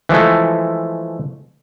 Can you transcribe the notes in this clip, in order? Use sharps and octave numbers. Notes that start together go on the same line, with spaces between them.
E3 F3 G#3 A3